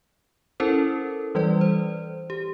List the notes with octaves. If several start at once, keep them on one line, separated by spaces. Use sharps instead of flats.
C#4 E4 A4 A#4 C5
E3 G3 B4 D5
C5
G4